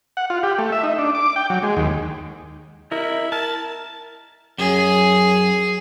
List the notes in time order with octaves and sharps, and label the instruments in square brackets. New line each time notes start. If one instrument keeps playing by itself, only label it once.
[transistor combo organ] F#5
F4
G4
A3
E5
D#4
D4
D6
G5
F#3
G#3
D#2
[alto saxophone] E4 [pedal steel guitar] A#4 D#5
[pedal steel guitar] A#4 F6 [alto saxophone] A5
[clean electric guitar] F#2 [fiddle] G#4